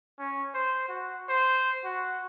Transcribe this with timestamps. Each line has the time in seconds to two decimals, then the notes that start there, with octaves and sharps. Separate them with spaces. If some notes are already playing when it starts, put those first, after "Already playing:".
0.18 C#4
0.54 C5
0.88 F#4
1.29 C5
1.84 F#4